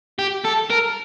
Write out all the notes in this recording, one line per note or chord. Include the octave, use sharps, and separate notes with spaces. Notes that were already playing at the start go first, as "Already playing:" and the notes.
G4
A4
A#4